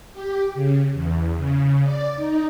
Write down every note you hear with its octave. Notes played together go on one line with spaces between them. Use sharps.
G4
C#3
E2
C#3
D5
D#4